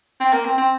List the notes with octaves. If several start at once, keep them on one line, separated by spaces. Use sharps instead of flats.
C4
A#3
C4
C4